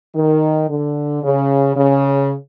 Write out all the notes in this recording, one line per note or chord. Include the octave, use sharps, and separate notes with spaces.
D#3
D3
C#3
C#3